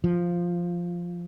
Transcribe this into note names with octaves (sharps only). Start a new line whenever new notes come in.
F3